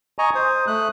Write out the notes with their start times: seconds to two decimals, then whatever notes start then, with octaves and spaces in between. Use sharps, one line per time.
0.19 D#5 G#5 A#5 C#6
0.35 C5 D#6
0.67 A3 D#6 F#6